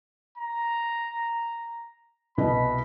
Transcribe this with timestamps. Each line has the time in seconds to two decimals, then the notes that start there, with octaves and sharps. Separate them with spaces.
0.38 A#5
2.38 C2 B2 D#5 B5